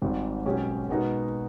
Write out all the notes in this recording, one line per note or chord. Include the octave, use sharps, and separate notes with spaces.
G#1 G#2 G3
B1 B2 G#3 C#4 G4
B2 G#3 B3 D#4 A#4